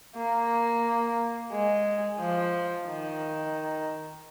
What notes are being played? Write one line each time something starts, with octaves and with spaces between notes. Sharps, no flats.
A#3
G#3
F3
D#3